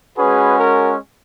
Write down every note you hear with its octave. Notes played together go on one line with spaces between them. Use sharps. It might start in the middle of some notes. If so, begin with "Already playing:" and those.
G#3 C#4 F#4 G#4 B4
A#4